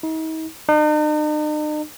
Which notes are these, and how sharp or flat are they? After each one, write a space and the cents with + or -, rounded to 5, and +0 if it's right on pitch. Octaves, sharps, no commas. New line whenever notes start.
D#4 +40
D#4 -45